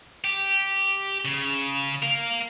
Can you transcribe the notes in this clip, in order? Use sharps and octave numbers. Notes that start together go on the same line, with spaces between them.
G4
C#3
A#4 F5